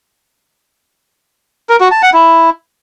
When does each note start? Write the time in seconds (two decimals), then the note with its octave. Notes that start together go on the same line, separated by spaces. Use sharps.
1.69 A#4
1.80 F#4
1.92 A5
2.03 F#5
2.14 E4